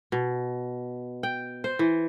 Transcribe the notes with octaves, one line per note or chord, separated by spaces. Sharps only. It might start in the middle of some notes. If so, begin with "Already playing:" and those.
B2
G5
C5
E3